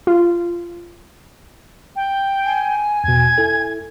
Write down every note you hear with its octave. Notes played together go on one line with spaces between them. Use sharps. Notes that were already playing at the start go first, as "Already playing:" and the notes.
F4
G5
G#5
E2 B2 G#6
E4 A4